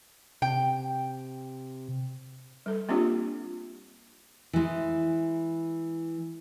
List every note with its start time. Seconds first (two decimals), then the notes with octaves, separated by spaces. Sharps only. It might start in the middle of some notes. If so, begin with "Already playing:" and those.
0.42 C3 G5
2.66 G3 A4
2.89 A#3 C4 D4 F4 G4
4.53 E3 G#3